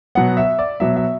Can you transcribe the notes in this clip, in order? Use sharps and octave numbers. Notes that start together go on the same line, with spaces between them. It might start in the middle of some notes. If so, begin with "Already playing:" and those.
B2 F#3 B3 F#5
E5
D5
B2 F#3 B3 E5
E5